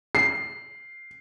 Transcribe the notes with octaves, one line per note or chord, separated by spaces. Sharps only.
C7